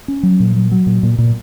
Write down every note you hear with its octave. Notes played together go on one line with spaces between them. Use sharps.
C#4
F#3
A#2
F#3
F#3
A#2
A#2
A#2